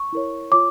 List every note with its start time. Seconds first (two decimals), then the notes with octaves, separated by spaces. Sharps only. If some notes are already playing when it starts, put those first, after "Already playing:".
Already playing: C#6
0.12 E4 A#4 C#5
0.51 F4 C#5 D6